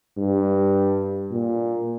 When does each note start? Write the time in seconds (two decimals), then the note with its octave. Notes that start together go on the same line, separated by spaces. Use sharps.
0.18 G2
1.32 A#2